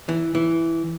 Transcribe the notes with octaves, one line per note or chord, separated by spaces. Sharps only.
E3
E3